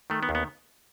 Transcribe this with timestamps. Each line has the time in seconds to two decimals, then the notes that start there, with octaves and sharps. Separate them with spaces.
0.10 D#3 A3
0.23 B3
0.29 D#2
0.35 B3